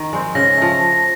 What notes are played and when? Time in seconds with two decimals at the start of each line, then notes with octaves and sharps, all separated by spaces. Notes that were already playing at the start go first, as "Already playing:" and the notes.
Already playing: D#3
0.13 G#3 C4
0.35 C#3 A#6
0.57 F3 A3